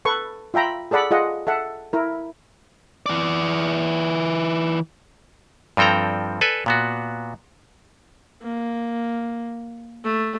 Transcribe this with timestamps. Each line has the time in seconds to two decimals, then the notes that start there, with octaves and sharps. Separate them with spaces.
0.05 A4 B4 C#6
0.54 F4 E5 G5 A#5 B5
0.91 G#4 A4 D5 F#5 B5
1.11 F4 G#4 D#5 F#5
1.47 A4 E5 F#5
1.93 E4 A#4
3.06 E3 D5
5.77 G2 F3 C4 A4 G5 A#5
6.41 A4 B4 D5 G#5
6.66 A#2 B3 F#4
8.42 A#3
10.04 A3